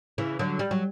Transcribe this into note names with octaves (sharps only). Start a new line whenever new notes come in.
C#3 E3
D3 F#3
G3
F#3